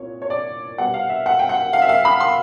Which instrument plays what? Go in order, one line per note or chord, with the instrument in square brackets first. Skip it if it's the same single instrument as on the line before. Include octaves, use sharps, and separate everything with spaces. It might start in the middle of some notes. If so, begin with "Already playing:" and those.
Already playing: [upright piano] C2 A#2 C#5
C#5
D5
B2 G3 B3 F#5
F5
E5
F#5
G5
F#5
F5
E5
F5
B5
C6